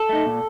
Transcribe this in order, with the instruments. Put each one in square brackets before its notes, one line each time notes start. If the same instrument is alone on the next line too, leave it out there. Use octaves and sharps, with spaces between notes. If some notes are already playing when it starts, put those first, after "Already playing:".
Already playing: [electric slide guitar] A4
A3 D#4
A#2